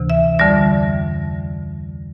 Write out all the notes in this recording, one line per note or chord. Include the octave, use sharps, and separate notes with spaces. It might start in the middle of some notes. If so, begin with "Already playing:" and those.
Already playing: D2 C3 E3
E5
F2 D3 G3 D5